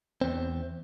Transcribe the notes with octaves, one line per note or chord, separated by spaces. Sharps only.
E2 C4